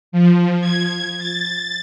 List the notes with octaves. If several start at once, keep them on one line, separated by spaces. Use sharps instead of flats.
F3
G#6
A6